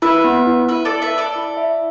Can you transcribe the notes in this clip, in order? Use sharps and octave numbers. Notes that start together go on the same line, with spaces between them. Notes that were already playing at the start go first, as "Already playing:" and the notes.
E4 B4 E5
B3
E4
E4 B4 E5
A4 D5
E4
B4 E5
E4
A4 D5
E4
E5